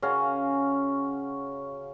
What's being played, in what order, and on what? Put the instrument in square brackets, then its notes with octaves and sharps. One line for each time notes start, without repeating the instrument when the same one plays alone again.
[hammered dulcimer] C#3 C#4 F#4 F5